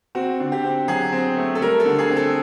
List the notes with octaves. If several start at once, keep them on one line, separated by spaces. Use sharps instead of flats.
C4 F#4
D3
G4
C4
F#3 G#4
C4
A3
A4
G3 A#4
A4
D3
G#4
C4
A4